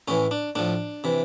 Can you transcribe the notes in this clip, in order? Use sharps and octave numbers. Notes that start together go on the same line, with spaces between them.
A2 E3 C#4
D4
A2 F3 D4
C3 E3